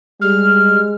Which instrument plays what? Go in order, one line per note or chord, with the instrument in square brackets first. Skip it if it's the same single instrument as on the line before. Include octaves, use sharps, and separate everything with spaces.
[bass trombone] G3 [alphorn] G#3 [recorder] F6